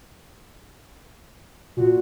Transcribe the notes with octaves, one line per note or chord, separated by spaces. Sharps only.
A#2 F#4